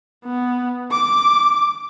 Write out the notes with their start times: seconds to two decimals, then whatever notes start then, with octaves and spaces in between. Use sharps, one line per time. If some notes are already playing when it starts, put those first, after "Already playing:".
0.24 B3
0.91 D6